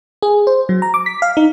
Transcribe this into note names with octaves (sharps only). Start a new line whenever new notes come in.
G#4
C5
F#3
A#5
D6
B6
F5
D#4